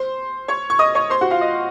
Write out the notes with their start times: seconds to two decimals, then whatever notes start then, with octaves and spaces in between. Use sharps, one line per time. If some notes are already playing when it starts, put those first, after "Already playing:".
Already playing: C5 C6
0.48 C#5 C#6
0.70 C#6
0.79 D#5 D#6
0.95 C#5 C#6
1.10 C5 C6
1.21 F#4 F#5
1.31 F4 F5
1.41 D#5